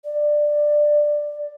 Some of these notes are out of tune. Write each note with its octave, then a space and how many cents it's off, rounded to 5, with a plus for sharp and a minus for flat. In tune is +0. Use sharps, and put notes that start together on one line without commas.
D5 +10